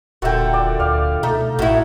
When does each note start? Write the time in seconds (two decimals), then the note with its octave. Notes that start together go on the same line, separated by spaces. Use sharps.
0.22 D#1 A#2 D3 F#4 E5 G5
0.53 D5
0.80 D2 D5 F5
1.23 B2 A3 D#4
1.59 A1 A2 E4 F#4